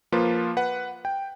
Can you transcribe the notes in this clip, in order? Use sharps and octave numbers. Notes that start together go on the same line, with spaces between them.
F3 A#3 F4 B4
B4 F#5
G5